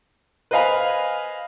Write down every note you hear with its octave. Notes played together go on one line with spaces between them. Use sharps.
B4 C5 D#5 F5 G#5 B5